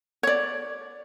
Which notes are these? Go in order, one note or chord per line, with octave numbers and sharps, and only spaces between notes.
C#5 D5